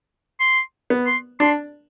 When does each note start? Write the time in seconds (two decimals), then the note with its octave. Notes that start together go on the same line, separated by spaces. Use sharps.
0.40 C6
0.90 B3
1.07 C6
1.40 D4 C6